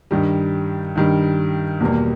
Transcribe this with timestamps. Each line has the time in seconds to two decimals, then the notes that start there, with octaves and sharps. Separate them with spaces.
0.11 G2 D#3 G3
0.96 G2 D#3 G3
1.80 E2 B2 G3 A#3